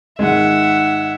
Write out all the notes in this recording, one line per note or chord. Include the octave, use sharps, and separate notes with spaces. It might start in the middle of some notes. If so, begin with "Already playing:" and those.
G#2 D#3 G#3 E5 F#5